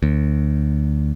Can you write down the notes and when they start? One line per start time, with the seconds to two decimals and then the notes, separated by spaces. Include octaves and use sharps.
0.03 D2